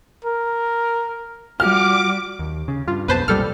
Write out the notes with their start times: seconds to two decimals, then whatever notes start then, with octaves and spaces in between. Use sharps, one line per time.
0.25 A#4
1.60 G3 F4 F#4 F#5 D6 F6
2.39 D#2
2.68 C#3
2.88 G2 F4
3.08 B1 F2 B3 B4 C5 A5
3.28 B1 F2 A#2 G3 A4 F6